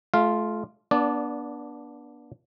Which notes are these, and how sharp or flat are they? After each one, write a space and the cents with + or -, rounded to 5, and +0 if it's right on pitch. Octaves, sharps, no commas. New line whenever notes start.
A3 -30 F4 +0 F5 +0
B3 -35 D4 -5 D5 -20